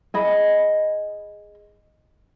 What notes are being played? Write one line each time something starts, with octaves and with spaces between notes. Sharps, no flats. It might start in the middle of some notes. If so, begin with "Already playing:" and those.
G#4 D#5 B5